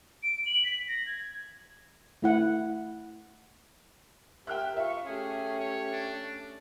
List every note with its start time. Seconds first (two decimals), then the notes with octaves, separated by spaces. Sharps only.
0.23 D7
0.46 F#7
0.64 B6
0.88 A#6
1.06 G#6
2.22 A3 E4 F#5
4.47 G4 A#4 E5 G5 F6 F#6
4.77 F4 E5 C#6
5.06 A3 C#4 G4 G#4
5.60 C#5
5.92 D4